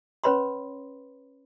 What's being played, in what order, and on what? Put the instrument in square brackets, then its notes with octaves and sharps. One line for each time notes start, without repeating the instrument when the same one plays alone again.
[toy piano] C#4 B4 C#5 B5 C6